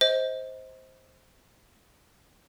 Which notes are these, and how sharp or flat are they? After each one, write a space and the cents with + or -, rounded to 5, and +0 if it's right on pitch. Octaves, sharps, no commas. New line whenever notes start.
C5 +0 D#5 +30